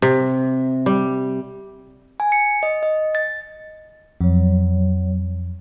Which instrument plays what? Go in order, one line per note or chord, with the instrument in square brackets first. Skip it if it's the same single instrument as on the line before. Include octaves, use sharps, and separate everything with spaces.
[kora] C3
G3
[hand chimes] G#5
C#7
D#5
D#5
A6
[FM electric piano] F2 [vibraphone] F#3 C#5